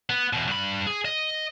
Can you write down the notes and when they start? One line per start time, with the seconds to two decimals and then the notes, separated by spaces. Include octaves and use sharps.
0.10 B3
0.33 E2 B2
0.47 G2 B5
0.87 G#4
1.05 D#5